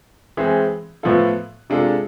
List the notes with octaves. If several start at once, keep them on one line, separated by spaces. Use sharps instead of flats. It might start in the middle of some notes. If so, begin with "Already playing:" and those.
E3 G#3 C4 G#4
A2 F3 B3 F4 A4
C3 G#3 D4 F4 A4